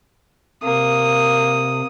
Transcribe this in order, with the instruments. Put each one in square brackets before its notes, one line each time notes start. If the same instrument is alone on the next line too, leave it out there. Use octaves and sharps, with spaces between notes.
[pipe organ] C3 [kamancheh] A#3 [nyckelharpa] D#6